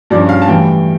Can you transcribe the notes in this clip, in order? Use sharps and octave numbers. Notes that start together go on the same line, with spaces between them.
G2 F3 C#4 D5
F5
A5
A2 E3 G3 G5